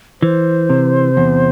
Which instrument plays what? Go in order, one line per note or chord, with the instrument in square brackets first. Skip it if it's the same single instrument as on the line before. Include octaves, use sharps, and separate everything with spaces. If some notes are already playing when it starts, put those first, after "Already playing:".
[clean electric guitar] E3 [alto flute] C5
[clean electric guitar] C3
E2